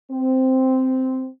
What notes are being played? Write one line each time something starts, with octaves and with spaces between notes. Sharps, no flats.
C4